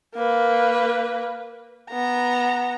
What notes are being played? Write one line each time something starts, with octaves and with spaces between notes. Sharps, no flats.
A#3 B4
B3 A#5